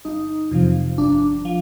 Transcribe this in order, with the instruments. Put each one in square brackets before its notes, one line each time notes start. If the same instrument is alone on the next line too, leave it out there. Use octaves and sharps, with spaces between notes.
[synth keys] G1 D#4
F2 C3 F3
G1 D4
F3